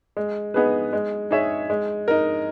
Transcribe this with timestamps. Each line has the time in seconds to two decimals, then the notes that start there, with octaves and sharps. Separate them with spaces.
0.17 G#3
0.54 B3 D#4 G#4 B4
0.93 G#3
1.31 D#4 G#4 C#5 E5
1.70 G#3
2.08 D#4 A#4